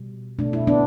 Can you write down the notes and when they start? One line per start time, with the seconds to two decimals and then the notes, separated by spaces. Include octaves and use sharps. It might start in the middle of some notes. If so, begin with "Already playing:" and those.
Already playing: B2 G3
0.39 B2 A3 D4
0.53 E4
0.67 B3 D4